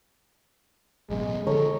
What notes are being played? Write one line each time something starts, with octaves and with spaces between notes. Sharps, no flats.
A1 F#2 B2 G#3
D3 F3 A4 A#4 C#5 D#5